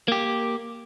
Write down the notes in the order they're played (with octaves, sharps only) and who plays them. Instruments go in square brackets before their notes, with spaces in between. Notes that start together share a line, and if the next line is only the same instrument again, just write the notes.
[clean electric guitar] A#3 G4